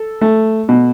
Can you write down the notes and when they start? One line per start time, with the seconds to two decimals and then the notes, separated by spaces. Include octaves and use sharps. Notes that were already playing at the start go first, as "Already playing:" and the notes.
Already playing: A4
0.21 A3
0.69 B2